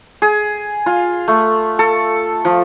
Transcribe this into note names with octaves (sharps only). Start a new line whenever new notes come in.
G#4
F4
A3
A4
F3